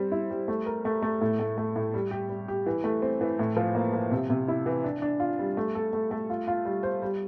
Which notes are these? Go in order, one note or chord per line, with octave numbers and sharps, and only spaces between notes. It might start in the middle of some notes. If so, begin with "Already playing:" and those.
Already playing: G3 C4
E4
G3
A3
A#4
A3
A3
A2
A3
A3
A2
G3
G4
G3
G4
E3
A3
C4
E3
A2
F3
A#3
F3
C3
C3
E4
E3
D4
D4
F4
G3
A3
A4
A3
A3
F4
F4
G3
C5
G3